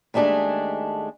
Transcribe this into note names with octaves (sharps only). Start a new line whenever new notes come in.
D#2 G#3 A3 D4 G#4